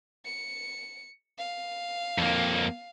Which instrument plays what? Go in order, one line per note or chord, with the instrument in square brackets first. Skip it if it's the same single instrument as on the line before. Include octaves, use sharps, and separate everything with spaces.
[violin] C#7
F5
[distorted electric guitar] F2 A#3